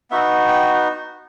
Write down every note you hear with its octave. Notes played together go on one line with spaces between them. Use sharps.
B3 D#4 F#4 E5
G5